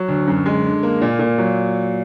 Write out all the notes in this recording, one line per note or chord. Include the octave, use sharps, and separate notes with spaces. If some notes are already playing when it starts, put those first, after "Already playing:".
Already playing: F#3
D2
F#2
G#3
D3
A#3
A#2
A#2
F#3